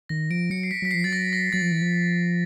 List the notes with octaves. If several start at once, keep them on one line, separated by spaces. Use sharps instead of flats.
D#3 A#6
F3 D7
F#3 C#7
C7
B6
F#3 B6
C7
F3
F#3 A6
A#6
A#6
F#3 A6
F3
E3
F3